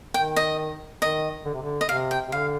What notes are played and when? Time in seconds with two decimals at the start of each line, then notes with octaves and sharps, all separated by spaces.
0.14 D#3 G5
0.36 D#5
1.02 D#3 D#5
1.45 D3
1.54 C3
1.62 D3
1.81 D#5
1.88 C3 F5
2.11 G5
2.28 C3
2.32 D3 F5